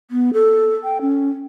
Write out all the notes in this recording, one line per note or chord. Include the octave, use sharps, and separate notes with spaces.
B3
A4
G5
C#4